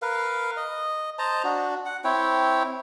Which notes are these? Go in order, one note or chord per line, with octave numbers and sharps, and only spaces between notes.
A#4 B4 F5
D#5
C5 D#5 A5 A#5
D4 F#4
F#5
C4 E4 C#5 G5